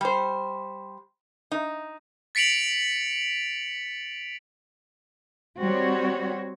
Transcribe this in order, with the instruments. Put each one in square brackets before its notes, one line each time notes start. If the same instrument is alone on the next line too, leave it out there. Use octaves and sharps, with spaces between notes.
[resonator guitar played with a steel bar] G3 C5
D#4
[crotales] A6 B6 C#7 D7 F7 F#7
[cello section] G3 C4 F#4 C#5